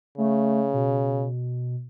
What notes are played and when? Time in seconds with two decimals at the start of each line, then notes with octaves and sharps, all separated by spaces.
0.18 C#3 A3
0.73 B2